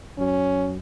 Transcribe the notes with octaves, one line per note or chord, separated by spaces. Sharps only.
F#2 F#3 C#4